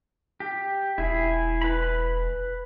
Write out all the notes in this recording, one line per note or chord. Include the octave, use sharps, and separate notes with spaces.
G4
E1 E4 G#4
B4 B5